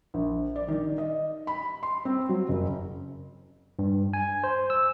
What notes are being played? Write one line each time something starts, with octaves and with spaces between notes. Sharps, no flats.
A#1
D5
D#3
D#5
B5
C6
C4
F#3
F#1
G2
G#5
C5
E6